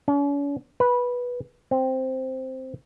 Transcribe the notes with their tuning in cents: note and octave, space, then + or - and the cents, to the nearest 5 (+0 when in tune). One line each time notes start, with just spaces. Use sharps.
C#4 +45
B4 -10
C4 +0